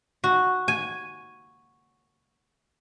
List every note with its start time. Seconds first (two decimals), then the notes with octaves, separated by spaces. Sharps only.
0.24 F#4
0.68 G#5